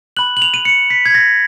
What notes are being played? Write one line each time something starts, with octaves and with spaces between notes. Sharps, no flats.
B5 F#6 F#7
F#7
F7
D#7
C#7
B6
G#6
A#6